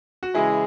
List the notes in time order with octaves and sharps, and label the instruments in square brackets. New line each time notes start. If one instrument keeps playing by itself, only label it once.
[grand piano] F#4
[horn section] C#3 E3 G#3 [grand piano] E4 G#4